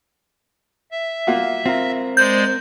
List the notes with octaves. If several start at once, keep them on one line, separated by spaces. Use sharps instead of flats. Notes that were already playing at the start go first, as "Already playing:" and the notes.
E5
A#3 F4 F#4
C4 F4 A#4
G#3 C5 D5 G6